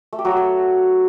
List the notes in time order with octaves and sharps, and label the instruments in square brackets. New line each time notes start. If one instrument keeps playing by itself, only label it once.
[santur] A3
G4
F#3
F#4
A4